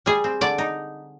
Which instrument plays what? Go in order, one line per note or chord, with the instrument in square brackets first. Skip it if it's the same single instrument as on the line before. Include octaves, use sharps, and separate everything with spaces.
[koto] G3 G#4
C4
D3 D5
D#4